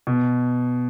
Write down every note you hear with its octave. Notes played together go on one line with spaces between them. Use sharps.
B2